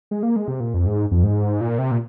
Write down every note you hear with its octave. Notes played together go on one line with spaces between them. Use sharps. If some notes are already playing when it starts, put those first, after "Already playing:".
G#3
A#3
G#3
C3
A#2
F2
G#2
F2
G#2
A#2
C3
A#2